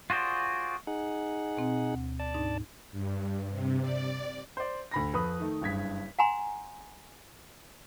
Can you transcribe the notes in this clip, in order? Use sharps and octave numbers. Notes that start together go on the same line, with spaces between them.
F4 F#4 G#4 C5 D5
D#4 G#4 F#5
B2 C4
D2
D5 A5
G#2 D4 D#4
G2
C3
D5
C5 D5
D2 B5 A#6
F2 B4 B5 D#6
D#3 A3
F#1 G2 G#6 B6
F#5 G#5 A#5 C6